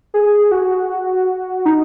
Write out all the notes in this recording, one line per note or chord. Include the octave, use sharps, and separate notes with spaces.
G#4
F#4
D#4